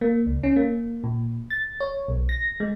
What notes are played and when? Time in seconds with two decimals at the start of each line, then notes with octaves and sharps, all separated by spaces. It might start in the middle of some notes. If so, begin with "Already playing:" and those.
0.01 A#3
0.26 C#2
0.43 C#4
0.56 A#3
1.04 A#2
1.50 A6
1.80 C#5
2.08 B1
2.29 A#6
2.60 G#3